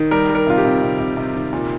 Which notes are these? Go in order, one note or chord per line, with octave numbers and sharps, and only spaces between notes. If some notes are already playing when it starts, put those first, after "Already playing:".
Already playing: D#3
G3 A#4
G3
A#4
C3 F4
G4
C3
C3
C3
C3
D#3
A#2